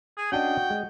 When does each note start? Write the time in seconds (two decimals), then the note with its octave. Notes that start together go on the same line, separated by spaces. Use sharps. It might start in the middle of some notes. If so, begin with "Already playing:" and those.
0.17 G#4
0.32 C#4 D4 F#4 D#5 G5
0.70 G#3